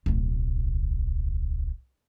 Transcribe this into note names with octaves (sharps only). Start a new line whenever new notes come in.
D1 B1